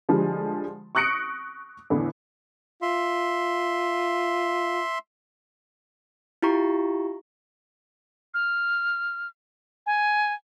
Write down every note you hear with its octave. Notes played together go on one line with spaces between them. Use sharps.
D3 F3 G3 G#3
C#6 D#6 F#6 A#6 C#7 D7
E2 A2 D3 B3
F4 E5 C6
E4 F4 G4 A#5 C#6
F6
G#5